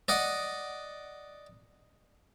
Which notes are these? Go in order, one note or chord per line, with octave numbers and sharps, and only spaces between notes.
D5 D#5 F#5